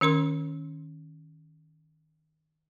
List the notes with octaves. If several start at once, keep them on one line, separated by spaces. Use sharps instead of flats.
D#3 C#4 A#4 C6